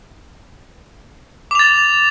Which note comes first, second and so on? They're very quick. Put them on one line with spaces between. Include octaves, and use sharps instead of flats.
D6 F7 A6